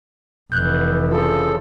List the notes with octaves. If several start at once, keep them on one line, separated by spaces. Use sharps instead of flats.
F1 E3 F#6 G6
C#3 F3 F4 A4